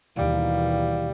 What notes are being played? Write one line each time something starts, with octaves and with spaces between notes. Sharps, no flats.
D#2 B2 E3 G3 F5